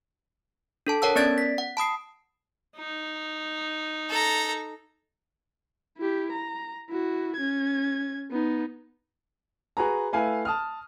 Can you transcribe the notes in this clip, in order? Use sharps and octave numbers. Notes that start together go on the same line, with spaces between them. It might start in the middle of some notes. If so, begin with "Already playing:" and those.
D4 A4 A5
A#4 C#5 F#5 A5 E6
B3 C#4 D5 G#6 A6 D7
B6
F#5
A5 B5 D#6 C7
D#4
A4 A#5
E4 G4
A#5
E4 F#4
C#4 G#6
B3 D#4
F#4 G#4 B4 A#5
A3 E4 B4 F5 G#5
A5 D#6 F6